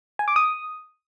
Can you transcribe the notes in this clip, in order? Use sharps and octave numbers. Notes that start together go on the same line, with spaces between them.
G#5
D6
D#6